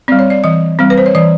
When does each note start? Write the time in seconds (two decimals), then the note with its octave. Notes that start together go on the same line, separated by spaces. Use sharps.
0.08 G3 C4 D5
0.19 C#5
0.30 D5
0.44 E3 D#5
0.79 G3 C4
0.90 B4
0.98 C5
1.06 C#5
1.15 E3 D5